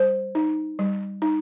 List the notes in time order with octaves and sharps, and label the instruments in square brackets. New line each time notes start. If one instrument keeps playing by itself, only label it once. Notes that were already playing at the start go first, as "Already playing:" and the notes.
Already playing: [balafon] G3 C5
D#4
G3
D#4